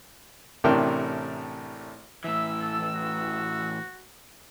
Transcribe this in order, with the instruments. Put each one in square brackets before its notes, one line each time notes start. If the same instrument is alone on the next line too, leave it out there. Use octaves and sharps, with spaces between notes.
[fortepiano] A1 A2 C3 D4 A#4 G5
[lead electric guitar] A2 E3 [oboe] E5 [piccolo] E6
[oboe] A4
F#4